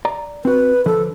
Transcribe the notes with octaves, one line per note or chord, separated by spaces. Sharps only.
D5 A#5
C4 F#4 B4
D3 F3 A4 B4